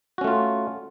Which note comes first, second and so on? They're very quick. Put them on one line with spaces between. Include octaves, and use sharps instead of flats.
F#4 C#4 A3 F4